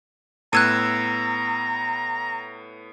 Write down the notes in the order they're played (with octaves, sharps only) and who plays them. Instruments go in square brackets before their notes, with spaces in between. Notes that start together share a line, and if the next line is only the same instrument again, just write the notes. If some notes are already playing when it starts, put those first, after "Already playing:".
[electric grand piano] A2 B3 E6 [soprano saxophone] A#5 [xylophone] F#6 G#6 D#7